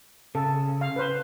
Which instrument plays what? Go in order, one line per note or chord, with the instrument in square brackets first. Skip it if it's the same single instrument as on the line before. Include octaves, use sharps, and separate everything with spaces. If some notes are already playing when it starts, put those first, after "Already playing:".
[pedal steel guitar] C#3 [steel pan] A4
[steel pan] F5
B4 C5